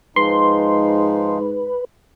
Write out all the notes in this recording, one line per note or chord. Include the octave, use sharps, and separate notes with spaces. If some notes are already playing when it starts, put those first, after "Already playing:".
G#2 F3 G#3 D#4 B4 C6